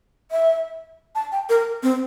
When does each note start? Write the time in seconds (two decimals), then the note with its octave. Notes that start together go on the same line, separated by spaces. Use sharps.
0.31 E5
1.15 A5
1.32 G5
1.49 A#4
1.83 C4